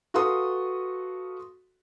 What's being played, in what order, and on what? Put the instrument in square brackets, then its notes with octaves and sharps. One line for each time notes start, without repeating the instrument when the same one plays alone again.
[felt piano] F#4 A4 B4 F5 C6 D#6